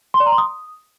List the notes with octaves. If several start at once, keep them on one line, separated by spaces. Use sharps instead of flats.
C6
D5
A#5
C6
D#6